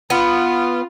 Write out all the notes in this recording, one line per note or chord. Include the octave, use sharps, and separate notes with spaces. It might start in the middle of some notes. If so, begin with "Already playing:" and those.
B3 F4